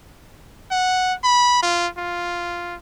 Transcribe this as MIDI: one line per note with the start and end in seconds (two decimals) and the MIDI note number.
0.71 1.14 78
1.24 1.60 83
1.63 1.88 65
1.98 2.75 65